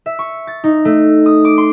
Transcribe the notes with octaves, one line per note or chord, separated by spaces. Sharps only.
E5
C#6
A6
D#4
A3
D#6
D6
C6